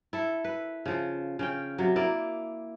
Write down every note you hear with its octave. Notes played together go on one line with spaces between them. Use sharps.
E4 A4
B4
C#3 F3
C#3 C#4 G5
C3 F#3
A#3 E4 D5